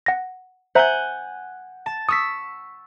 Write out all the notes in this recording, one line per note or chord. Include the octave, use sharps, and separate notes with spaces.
F#5 A#6
C5 E5 F#5 G#5 A#5 G6
A5
C#6 D#6 E6 B6